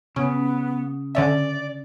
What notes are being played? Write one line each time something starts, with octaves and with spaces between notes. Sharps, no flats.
C#3 B3 C#4
D3 C#4 D5 E5